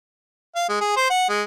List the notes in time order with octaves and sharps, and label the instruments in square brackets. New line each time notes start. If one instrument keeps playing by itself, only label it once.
[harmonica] F5
G#3
G#4
C5
F#5
G#3